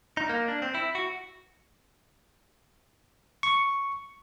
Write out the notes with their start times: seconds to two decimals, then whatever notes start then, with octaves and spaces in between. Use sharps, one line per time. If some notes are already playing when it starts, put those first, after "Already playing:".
0.17 D#4
0.29 A#3
0.48 D4
0.62 C4
0.75 E4
0.95 F#4
3.43 C#6